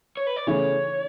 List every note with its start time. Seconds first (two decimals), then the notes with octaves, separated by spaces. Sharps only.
0.17 C#5
0.27 B4
0.36 D5
0.47 C#3 E3 A3 E4 C#5